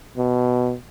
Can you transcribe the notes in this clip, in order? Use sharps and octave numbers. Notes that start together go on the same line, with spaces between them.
B2